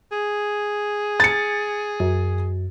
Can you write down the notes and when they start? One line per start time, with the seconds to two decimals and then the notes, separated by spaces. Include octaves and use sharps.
0.12 G#4
1.20 A6 C#7
2.00 F#2